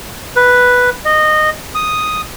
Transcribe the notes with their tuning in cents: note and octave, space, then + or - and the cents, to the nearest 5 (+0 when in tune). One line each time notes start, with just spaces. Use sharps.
B4 +0
D#5 -20
D#6 +0